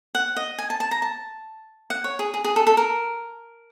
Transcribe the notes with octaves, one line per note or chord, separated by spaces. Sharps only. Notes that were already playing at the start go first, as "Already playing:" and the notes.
F#5
D#5
G#5
A5
A5
A#5
A5
F#5
C#5
G#4
G#4
G#4
A4
A4
A#4